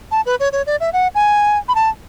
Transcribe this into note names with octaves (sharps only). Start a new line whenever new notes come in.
A5
B4
C#5
C#5
D5
E5
F#5
G#5
B5
A5